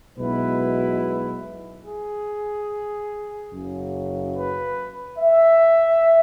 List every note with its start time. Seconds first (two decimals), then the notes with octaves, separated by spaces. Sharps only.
0.18 B1 B2 G#3 B3 E4 B4
1.85 G#4
3.52 F#1 F#2 C#3 F#3
4.36 B4
5.19 E5